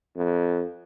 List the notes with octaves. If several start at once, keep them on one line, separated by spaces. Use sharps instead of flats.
F2